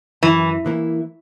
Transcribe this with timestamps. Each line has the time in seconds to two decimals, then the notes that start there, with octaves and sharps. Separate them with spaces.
0.23 F#2 E3
0.66 E3 A#3 E4